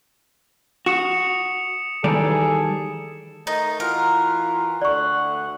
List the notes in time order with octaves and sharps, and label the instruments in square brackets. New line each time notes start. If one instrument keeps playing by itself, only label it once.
[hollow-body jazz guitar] F#4 [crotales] D#6 C#7 E7
[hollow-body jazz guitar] D#3 G3 D5 [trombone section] E3 G#4 A4
[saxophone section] A3 A#4 D#5 [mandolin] D#4
[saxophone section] E3 F4 F#4 [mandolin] A#4
[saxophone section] D2 A3 F#5 [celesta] D5 C#6